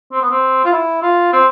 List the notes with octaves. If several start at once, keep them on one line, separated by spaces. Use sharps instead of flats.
C4
B3
C4
F4
E4
F4
C4